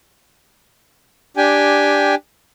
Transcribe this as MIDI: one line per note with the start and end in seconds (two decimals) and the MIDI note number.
1.37 2.15 62
1.37 2.15 67
1.37 2.15 79
1.37 2.15 80